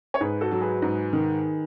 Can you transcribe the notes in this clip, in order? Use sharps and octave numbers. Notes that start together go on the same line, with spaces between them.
C#5
G#2 G#4 B4
F#4 A4
F#3
G#4 B4
G#2
D#3